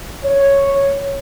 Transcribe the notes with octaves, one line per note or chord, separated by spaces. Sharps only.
C#5